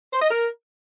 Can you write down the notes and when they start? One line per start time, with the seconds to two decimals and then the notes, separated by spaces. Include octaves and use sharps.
0.13 C5
0.22 D#5
0.31 A#4